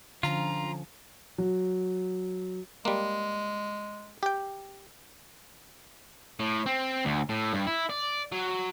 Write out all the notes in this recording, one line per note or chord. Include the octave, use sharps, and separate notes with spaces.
D3 F3 C#4 F4 A#5
F#3
G3 G#3 A#3
G4 G5
A2
C4
D2
A2
G2
E4
D5
F#3